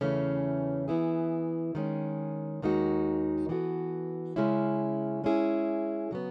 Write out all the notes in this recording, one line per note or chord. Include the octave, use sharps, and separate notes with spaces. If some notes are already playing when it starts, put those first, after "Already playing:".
E2 C#3 E3 A3 C#4
E3 B3 E4 G#4
D#3 G#3 C#4
D#2 D#3 G#3 D#4 F#4
E3 B3 F#4 A4
C#3 G#3 C#4 E4
G#3 C#4 E4 G#4
C#3 F#3 B3